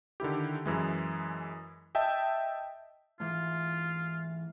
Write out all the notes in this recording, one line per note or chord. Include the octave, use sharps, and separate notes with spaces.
D3 D#3 E4 G4
F#2 E3 G#3
D#5 E5 G5 A5
G#2 E3 F4